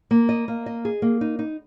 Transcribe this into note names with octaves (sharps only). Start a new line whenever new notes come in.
A#3
D#5
A#3
D#5
G#4
A#3
D#4
D#4